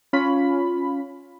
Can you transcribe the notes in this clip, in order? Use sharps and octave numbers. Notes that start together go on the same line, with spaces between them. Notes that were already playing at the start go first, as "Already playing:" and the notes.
C#4 F4 B5